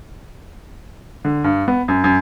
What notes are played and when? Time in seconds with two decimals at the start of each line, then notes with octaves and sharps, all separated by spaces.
1.25 D3
1.44 G2
1.68 B3
1.88 F#2
2.04 F#2